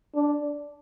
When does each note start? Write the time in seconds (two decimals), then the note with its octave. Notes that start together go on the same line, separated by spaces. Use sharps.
0.15 D4